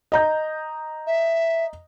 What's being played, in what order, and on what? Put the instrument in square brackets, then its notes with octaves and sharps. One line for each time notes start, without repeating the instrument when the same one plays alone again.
[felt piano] D#5 A#5 G6
[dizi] E5